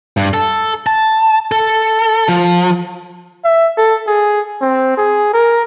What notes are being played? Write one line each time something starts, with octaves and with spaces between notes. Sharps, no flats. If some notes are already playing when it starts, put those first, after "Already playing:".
G2
A4
A5
A4
F3
E5
A4
G#4
C4
G#4
A#4